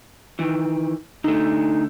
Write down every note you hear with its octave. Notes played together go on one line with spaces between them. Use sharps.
D#3 E3
D3 A3 D#4